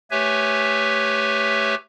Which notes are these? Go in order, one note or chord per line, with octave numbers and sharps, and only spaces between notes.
A3 G4 B4 C#5 E5 G#5